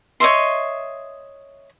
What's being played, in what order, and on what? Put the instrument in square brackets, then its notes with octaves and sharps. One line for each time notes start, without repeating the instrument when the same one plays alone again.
[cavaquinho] C#5 D#5 E5 C6